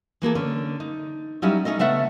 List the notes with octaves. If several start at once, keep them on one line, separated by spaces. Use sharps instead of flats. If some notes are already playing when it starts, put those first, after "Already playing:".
E3 A#3 G#4 A4
D3 C#4
D#4
F#3 G3 C#4 D#4 E4
A3 C#4 D#4 A4 D#5
C#3 A3 B3 A4 E5 F#5